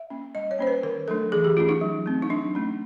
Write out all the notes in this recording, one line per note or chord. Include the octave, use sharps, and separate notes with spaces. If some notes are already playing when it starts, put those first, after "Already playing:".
Already playing: E5
A#3 C#4
G3 D#5
C#5
A#3 C#4 C5
B4
D#3 A#4
F#3 A3 D4 A4
E3 G#4
G4
A3 C#4 F4
D#4
F#3
A3 C4
D#4
F#3 D4
A3 C#4